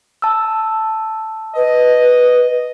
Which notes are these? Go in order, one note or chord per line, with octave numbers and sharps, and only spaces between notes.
A5 E6
B4 D#5